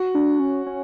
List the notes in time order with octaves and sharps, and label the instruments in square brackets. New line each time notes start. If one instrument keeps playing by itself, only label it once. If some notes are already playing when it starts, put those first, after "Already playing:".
Already playing: [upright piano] F#4
[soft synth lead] D4
C#4
C#4